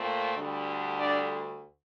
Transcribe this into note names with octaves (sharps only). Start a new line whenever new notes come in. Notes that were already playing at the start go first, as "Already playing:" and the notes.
Already playing: A#2 A3 C4
D2 D3 G3
D4 D5